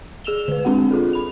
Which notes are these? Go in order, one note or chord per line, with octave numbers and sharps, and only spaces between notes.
G#4 E6 E7 F7 G7
D3 B4
G#3 C4 D4 F#4 F#5
F4 G#4 A4
B5 F7